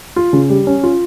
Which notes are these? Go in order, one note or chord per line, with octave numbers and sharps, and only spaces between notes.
F4
C#3
G3
C#4
F4